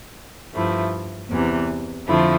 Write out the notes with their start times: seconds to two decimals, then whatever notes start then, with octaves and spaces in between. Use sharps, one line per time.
0.54 G2 F3 A3 E4
1.30 E2 C3 E3
2.07 F2 D3 F3 A3 E4